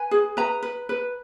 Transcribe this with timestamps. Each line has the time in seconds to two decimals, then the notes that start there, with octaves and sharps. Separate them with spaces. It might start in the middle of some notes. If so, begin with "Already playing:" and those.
Already playing: B4 G#5
0.11 G#4
0.37 B4 A#5
0.63 B4
0.89 B4